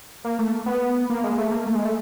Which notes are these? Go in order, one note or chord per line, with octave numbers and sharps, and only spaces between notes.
A#3
A3
B3
A#3
G#3
A3
A#3
A3
G#3
A3